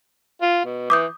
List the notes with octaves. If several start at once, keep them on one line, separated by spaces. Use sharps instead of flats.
F4
B2
E3 D6 D#6 G6